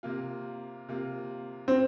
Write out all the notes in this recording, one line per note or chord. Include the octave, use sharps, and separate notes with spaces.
C3 A#3 F4
C3 A#3 F4
C4